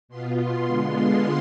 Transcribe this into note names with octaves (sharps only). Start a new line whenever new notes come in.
B2 B3 F4 C6
C6
D3 G#3 B3 F4 C6